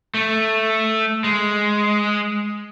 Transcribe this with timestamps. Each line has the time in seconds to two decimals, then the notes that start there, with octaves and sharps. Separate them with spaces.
0.14 A3
1.24 G#3